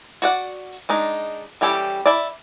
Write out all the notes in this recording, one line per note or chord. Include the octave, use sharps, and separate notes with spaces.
F#4 D5 F#5
G#3 D4 D#4
E3 G3 C#4 G4 A4
E4 D5